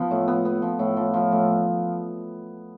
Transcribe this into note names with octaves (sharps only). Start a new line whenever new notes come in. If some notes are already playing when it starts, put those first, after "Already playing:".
Already playing: F3 B3
A2
B3
B3
F3
A2
F3
F3
A2